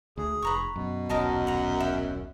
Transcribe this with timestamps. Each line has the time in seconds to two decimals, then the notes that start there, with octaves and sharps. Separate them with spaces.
0.17 D2 G#4
0.42 F1 B4 A#5 C#6
0.76 F#2 B2
1.09 D#1 B1 F#2 A#4 D#5 A5
1.47 F#5 A#5
1.80 E5